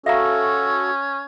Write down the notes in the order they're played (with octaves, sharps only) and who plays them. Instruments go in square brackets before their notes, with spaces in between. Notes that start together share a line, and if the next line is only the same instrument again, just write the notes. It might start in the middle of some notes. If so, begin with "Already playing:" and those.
[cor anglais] C#4 [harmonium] F#4 A4 [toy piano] E5 F5 A#5